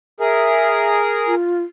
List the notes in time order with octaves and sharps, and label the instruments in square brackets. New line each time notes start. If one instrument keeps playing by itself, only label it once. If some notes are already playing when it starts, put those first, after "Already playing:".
[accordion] G#4 A#4 [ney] E5
[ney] F4